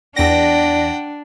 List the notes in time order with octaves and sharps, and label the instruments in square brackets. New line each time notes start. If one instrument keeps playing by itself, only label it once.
[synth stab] E2 A#6 [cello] D4 [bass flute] D5 [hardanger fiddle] F#5 G5